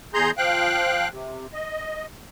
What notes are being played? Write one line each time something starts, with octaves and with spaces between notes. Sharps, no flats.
E2 G#4 A#5 C6 G6
F3 F5 G5 F#6
C3
D#5